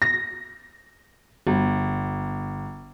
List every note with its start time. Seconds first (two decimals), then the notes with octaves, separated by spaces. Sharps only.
0.02 A#6
1.47 G1